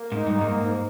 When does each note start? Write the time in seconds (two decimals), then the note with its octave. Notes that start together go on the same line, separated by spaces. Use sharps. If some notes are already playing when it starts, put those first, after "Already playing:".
Already playing: A#3
0.12 G#2 D#4
0.27 G2
0.34 A#3
0.41 G#2
0.55 G#2